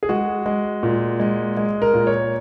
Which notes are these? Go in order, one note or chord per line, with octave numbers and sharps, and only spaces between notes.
G#4
G#3 F#4
G#3
A#2
G#3
G#3
A#4
A#2
C#5